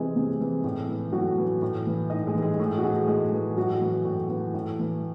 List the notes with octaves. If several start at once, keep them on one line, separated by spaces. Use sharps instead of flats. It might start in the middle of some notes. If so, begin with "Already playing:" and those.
Already playing: C3 E3 G#3 G#4
C3
E3
A2
E3
A2 F#3 F#4
E3
A2
E3
A2 D#4 D#5
G#3 G#4
E3
G#3 G#4
A2 A3 A4
F#4
E3 G#3 G#4
A2 G#3 G#4
E3
A2 F#3 F#4
E3
A2
E3
A2
E3